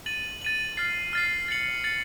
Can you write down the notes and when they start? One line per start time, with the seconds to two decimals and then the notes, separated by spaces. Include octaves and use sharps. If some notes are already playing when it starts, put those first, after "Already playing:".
0.06 A6 D#7 F#7
0.42 A6 D#7 F#7
0.77 F6 A6 C7
1.13 F6 A6 C7
1.48 A6 C#7 F#7
1.84 A6 C#7 F#7